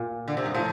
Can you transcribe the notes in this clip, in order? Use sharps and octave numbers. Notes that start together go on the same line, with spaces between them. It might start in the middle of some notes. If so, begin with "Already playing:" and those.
Already playing: A#2
D3
C3
G2
A2 F3